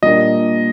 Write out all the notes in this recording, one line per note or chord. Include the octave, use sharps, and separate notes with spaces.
A#2 G3 A#3 D4 D#5